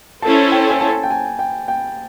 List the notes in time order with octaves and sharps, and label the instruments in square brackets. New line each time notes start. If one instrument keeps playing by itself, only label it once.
[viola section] C#4 E4 A4 C5 [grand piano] A5
[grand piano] G5
G#5
A5
G5
G#5
G5
G5